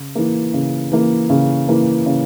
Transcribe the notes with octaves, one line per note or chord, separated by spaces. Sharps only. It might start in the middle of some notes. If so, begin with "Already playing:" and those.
Already playing: C#3
E3 A#3
C#3
E3 A#3
C#3
E3 A#3
C#3